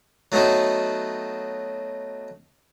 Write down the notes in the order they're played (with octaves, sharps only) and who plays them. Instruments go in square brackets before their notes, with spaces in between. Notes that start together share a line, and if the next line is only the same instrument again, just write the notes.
[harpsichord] F#3 A3 B3 D#4 F#4